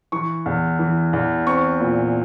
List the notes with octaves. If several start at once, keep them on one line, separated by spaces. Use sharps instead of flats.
E3 C#6
E2
E3
E2
C4 C#6
A#2